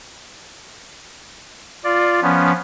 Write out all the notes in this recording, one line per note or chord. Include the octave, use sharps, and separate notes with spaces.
F4 D5
F3 B3 C#4